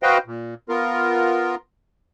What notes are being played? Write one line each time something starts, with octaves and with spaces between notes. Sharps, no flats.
F#4 B4 C5 D#5 F5 G5
A#2
B3 F4 A#4